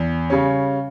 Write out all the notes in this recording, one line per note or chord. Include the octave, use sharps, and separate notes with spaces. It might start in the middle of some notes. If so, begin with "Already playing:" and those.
Already playing: E2
C#3 G3 C#4